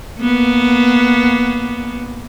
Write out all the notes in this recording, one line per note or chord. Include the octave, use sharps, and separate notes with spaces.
A#3 B3